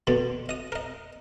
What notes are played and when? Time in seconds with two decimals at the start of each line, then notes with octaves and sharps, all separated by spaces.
0.07 B2 D3 B5
0.49 D#5 D#6
0.72 A#4 D#5